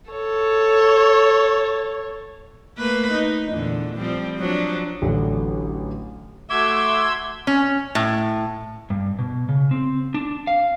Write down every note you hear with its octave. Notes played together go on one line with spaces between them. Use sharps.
A4 C#5
A3 A#3 B4
D#4
E2 A#2 D3
F3 G3 C4
F3 F#3 D4
A1 D3 F#3
A3 F#4 E5 C6 D6 E6 G#6
C#4
A2
G2
B2
C#3
C4
D4
F5